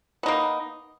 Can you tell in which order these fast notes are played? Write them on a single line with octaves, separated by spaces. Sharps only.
B3 D#4 A#3